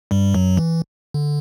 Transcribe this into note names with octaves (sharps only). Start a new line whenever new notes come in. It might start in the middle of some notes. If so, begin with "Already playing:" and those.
G2 G3
F#2 F#3
E3
D3